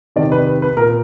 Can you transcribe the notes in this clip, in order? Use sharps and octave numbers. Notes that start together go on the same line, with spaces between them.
C3 D#3 D5
B4
B4
B4
A#2 A#4